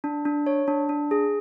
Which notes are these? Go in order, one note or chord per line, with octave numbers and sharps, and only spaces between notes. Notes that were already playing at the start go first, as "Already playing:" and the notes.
D4
D4
C#5
D4
D4
G#4